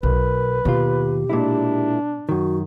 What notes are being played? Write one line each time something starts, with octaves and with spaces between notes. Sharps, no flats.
B1 A#4 B4
D#2 B2 F4 G4
A#2 G#3 D4 E4
F#2 D#3 F#4